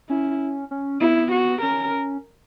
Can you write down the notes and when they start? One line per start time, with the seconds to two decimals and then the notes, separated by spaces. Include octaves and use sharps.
0.09 C#4 E4
0.71 C#4
1.01 B3 E4
1.32 F#4
1.62 C#4 A#4